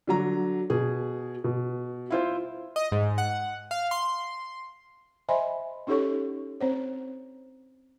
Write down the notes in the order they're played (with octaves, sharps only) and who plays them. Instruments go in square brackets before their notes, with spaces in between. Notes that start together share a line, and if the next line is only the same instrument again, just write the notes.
[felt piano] D3 F#3 A#5
B2 G#4
B2
E4 F4 C5
[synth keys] D#5
G#2
F#5
F5
C6
[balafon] C5 D#5 E5 G#5 B5 C6
C#4 D#4 G4 A4 C#5 C#6
C4 C5 C#5